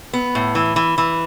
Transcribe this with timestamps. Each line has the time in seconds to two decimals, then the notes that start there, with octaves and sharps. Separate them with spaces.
0.13 B3
0.35 A2
0.55 E3
0.76 E3
0.98 E3